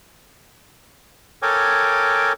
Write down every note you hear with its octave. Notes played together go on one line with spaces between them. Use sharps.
A4 A#4 C#5 G5 G#5 D6